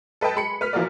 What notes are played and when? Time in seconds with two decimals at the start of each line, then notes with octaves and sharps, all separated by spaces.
0.21 A4 B4 D#5 G5 A5
0.36 G#3 B5 C#7
0.61 B4 F6 B6
0.73 E3 F3 A#3 F#4 A#4 D5